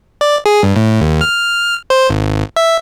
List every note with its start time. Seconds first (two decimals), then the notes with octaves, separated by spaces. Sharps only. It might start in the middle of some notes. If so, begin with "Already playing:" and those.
0.21 D5
0.46 G#4
0.63 G2
0.76 A2
1.01 D#2
1.21 F6
1.90 C5
2.10 G#1
2.56 E5